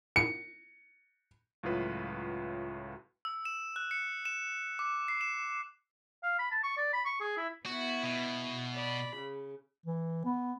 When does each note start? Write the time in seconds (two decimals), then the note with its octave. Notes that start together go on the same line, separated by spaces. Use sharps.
0.16 C#7
1.63 C#2 A2 F#3 F4 B4
3.25 E6
3.45 E7
3.76 F#6
3.91 C#7
4.25 E7
4.79 D6
5.08 C7
5.21 E7
6.23 F5
6.39 B5
6.51 A5
6.63 C#6
6.77 D5
6.93 B5
7.05 C#6
7.20 G#4
7.37 E4
7.66 B3 E4 F#4
8.03 B2
8.73 D5 B5
9.16 C#3
9.86 E3
10.25 B3